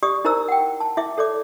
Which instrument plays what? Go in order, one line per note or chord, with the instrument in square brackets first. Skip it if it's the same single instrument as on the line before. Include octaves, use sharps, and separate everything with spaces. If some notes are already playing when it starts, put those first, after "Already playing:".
[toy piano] G4 D5 C#6 D#6
D#4 E4 A#4 C5 A#5 E6
F#5 G5
A5
E4 E5 D6
A4 C#5 D5 D6